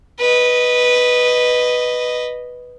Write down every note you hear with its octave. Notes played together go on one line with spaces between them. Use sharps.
B4 D#5